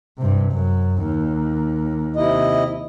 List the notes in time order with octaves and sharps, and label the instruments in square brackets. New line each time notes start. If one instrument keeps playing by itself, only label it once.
[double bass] G2 C3
F#2
D#2
[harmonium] C3 E4 D#5